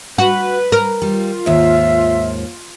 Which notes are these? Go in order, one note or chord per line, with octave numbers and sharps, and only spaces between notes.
F#4 B4
A#4
G3 F4
D#2 G#2 E5